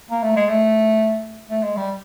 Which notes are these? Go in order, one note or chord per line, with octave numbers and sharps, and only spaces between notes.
A#3
A3
G#3
A3
A3
G#3
G3